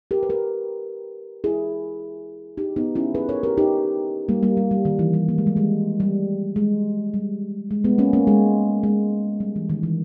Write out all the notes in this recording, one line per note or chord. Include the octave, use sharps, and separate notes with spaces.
G4 A#4
B4
G4 A#4
E4 G#4
D#4 G4
B3 D#4
C#4 E4
G#4 B4
A#4 C#5
G4 A#4
D#4 G4
G3 A#3
G3 A#3
G3
G3
D#3
E3
G3
A#3
G#3
G3
G#3
G3
G#3
G3
G#3
G#3 B3
A#3 C#4
A#3 C#4
G#3
G#3
G3
E3
D#3
E3